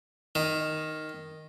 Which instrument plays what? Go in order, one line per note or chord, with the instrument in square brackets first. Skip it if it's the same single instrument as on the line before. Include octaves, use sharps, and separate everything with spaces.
[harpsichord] D#3